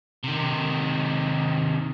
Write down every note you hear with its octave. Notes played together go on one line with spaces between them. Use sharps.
C3 D#3